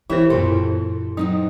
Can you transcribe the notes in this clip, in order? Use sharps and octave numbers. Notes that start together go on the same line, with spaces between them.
E3 B3 E4 G4 A#4 C5
F#2 A#2 B3 F4 A4 C6
F#3 B3 C4 D#4